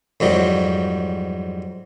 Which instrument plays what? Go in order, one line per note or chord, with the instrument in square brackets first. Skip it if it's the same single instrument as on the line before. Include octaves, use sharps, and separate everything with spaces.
[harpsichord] F2 G#2 F#3 G3